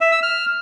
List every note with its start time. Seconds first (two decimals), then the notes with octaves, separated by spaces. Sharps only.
0.01 E5
0.12 E6
0.23 F6